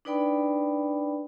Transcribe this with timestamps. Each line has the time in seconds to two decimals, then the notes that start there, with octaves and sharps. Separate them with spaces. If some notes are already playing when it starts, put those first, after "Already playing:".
0.05 D4 D#4 B4 D5 G5 B5